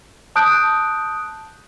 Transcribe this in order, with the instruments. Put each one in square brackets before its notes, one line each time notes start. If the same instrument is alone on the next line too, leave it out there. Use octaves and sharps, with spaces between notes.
[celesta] A5 D#6 F#6 G6 D7